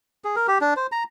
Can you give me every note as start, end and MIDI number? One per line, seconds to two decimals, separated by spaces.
0.24 0.36 68
0.36 0.47 70
0.48 0.58 67
0.61 0.74 62
0.76 0.87 72
0.92 1.04 82